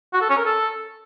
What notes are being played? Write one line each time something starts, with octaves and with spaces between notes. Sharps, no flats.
F#4
A4
C#4
A#4
A4